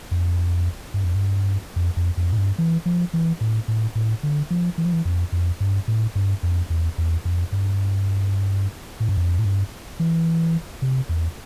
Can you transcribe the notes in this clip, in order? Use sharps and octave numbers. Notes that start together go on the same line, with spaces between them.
F2
G2
F2
G2
F2
F2
F2
A2
G2
E3
F3
E3
A2
A2
A2
D3
F3
E3
F3
E3
F2
F2
G2
A2
G2
F2
E2
E2
F2
G2
A2
G2
F2
A2
G2
E3
C3
E2